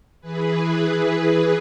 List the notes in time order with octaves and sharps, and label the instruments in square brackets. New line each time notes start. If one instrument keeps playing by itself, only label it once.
[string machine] E3 G#4 B4